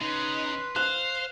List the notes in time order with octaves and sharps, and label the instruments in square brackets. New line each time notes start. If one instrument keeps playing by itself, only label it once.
[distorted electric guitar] C#3 C#4 [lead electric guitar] D#4 [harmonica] B4 C6
[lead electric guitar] C5 [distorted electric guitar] F5 [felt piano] F#6